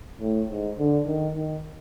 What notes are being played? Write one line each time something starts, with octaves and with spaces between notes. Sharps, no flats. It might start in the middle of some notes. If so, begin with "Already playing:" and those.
A2
G#2
D3
D#3
D#3